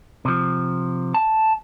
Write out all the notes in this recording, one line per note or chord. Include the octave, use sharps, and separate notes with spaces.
C3 F3
A5